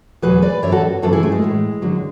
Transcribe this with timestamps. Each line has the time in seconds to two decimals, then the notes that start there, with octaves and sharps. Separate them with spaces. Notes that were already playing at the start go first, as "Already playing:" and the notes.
0.22 E2 B2 F#3 G#4 B4
0.42 B4 D5
0.62 F#2 E3 C#5 E5
0.72 F#4 A4
1.02 F#2 C#3 E3 F#4 A4
1.13 E4 G#4
1.23 A3
1.32 G#3
1.42 A2 E3
1.82 F#2 D3 F#3